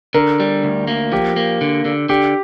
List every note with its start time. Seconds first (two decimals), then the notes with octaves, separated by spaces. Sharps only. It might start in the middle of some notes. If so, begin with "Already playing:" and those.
0.14 D3 A#4
0.40 G3
0.64 D2
0.87 A#3
1.12 F3 G4
1.36 A#3
1.61 D3
1.85 D3
2.09 D3 G4